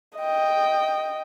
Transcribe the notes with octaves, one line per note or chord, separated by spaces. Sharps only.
D#5 G5